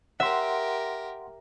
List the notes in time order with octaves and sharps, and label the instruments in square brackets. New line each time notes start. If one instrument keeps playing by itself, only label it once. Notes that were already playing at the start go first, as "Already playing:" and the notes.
[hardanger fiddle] G4 A#4 [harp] E5 [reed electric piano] F#5 C6